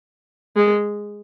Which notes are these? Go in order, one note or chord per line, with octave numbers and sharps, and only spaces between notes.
G#3